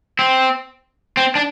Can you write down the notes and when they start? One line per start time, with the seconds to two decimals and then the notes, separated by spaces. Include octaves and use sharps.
0.19 C4
1.17 C4
1.35 D4